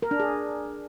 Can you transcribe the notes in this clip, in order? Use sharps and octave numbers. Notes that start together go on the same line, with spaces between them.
A#4
D4
G#4